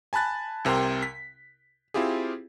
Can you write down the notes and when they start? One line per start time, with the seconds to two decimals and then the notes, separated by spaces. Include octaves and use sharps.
0.13 G#5 A5 B5 F#6 A6
0.65 C2 C3 A#4 G5 C6
1.03 B6
1.94 C4 E4 F4 G4 G#4